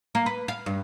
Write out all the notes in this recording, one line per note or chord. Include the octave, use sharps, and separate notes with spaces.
A#3
B4
F5
G2